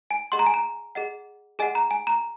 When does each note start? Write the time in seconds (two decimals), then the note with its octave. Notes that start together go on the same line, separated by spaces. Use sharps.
0.11 G#5
0.32 G#4 D#5 F#5 C6
0.39 A#5
0.46 G#5
0.54 A#5
0.95 G#4 D#5 F#5
1.59 G#4 D#5 F#5 G#5
1.75 A#5
1.91 G#5
2.07 A#5